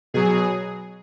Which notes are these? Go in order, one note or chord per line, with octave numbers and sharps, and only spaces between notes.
B2 F#3 G#4